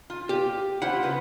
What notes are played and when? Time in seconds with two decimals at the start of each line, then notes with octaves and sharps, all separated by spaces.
0.10 F4
0.29 G4
0.82 E4 F4 C5 F#5
1.03 C#3 B3 B4